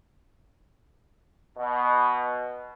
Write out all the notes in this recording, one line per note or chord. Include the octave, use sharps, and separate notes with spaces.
B2